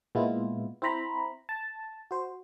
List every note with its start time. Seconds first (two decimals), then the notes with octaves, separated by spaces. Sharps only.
0.15 A#2 G#3 B3 E4 F4
0.82 C4 E4 C5 A#5 B5
1.49 A5
2.11 F#4 C5